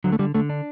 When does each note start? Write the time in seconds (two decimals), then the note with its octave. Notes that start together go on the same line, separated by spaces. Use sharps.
0.04 D3 F#3
0.12 A3
0.19 D3 G3
0.35 D3 A3
0.50 D4